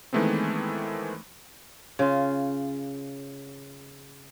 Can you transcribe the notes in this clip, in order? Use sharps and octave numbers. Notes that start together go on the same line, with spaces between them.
D#3 E3 G#3 A3 B3 C4
C#3 F4